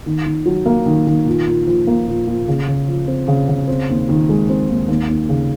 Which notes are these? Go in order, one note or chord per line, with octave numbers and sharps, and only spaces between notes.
D#3
D#3
F#3
A#3
D#3
D#3
A#2
A#2
F3
A#3
A#2
A#2
C#3
C#3
F3
C4
C#3
C#3
C4
D#2
D#3
G#3
C4
D#2
D#2
D#2
C#3